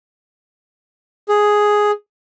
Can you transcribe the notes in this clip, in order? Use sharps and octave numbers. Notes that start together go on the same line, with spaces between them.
G#4